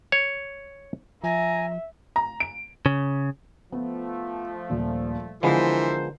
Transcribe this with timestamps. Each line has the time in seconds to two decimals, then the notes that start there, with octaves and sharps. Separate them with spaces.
0.12 C#5
1.24 F3 E5 G#5 A#5
2.16 A#5
2.40 D7
2.86 C#3
3.72 F3 A3 B3
4.70 D#1 A#2
5.43 D3 E3 F3 G#3 B3 A#4 C5 C7